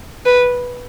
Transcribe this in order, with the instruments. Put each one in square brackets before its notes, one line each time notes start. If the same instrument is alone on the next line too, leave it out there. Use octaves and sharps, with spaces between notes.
[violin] B4